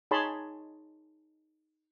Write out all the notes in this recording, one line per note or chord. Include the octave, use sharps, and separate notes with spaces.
D#4 G#4 C#5 A5 B5 C6